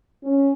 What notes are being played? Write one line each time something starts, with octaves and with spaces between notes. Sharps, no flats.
C#4